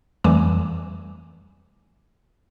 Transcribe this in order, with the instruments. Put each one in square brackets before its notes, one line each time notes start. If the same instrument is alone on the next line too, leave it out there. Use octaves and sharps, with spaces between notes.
[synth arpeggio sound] F2 E3 G3 A3 G#5 D6